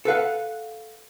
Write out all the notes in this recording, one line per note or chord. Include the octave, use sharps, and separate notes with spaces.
A4 B4 F5 F#5